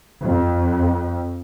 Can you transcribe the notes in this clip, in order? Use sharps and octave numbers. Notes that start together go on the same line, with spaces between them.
F2